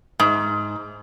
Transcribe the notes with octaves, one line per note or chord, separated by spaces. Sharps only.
G#2